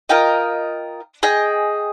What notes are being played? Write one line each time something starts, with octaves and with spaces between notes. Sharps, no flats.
F4 A#4 D#5 G5
G#4 D#5 G5